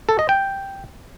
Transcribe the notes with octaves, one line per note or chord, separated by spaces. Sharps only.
A4
D#5
G5